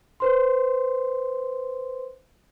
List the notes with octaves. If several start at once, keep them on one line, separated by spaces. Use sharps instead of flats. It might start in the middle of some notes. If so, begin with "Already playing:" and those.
B4 C5 C6